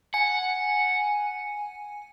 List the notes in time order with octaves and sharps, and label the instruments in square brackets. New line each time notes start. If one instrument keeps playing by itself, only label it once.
[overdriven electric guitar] F#5 [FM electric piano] G#5